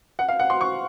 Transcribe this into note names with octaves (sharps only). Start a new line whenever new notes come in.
F#5
F5
F#5
C6
C#6